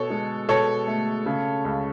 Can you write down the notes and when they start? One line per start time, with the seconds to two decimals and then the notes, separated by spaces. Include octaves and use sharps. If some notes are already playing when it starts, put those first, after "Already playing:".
Already playing: B2 A4 C#5
0.10 G#3
0.49 B2 A4 C#5
0.87 A3
1.26 C#3
1.65 C#2